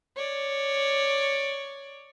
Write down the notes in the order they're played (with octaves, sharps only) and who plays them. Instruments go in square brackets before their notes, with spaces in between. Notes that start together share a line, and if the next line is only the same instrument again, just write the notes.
[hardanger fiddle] C#5 D5